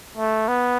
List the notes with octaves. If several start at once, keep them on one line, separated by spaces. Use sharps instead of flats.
A3
B3